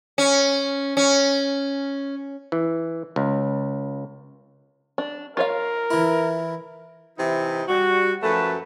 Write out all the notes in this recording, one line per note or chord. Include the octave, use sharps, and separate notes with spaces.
C#4
C#4
E3
C#2
D4
F4 A#4 C#5 F5
E3 E4
C3 E3 D#4 E4
G3 F#4
F#2 F3 A3 A4 B4